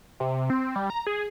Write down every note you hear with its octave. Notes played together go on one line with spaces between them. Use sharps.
C3
C4
G3
A#5
G#4